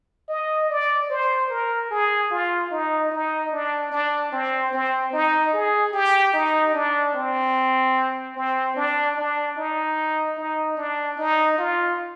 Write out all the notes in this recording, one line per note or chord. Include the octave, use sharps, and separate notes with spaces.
D#5
D5
C5
A#4
G#4
F4
D#4
D#4
D4
D4
C4
C4
D#4
G#4
G4
D#4
D4
C4
C4
D4
D4
D#4
D#4
D4
D#4
F4